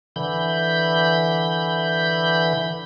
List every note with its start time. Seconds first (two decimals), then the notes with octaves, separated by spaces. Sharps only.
0.16 D3 E3 B5 G6